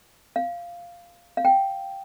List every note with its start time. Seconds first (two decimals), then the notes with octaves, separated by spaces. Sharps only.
0.36 F5
1.37 F5
1.45 G5